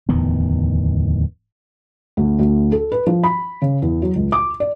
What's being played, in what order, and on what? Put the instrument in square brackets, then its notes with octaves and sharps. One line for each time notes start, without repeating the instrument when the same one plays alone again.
[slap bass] D1 E2 D#3 B3
[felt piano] D2
D2
A4
B4
F3
B5
C#3
E2
F#3
C#2
D6
D5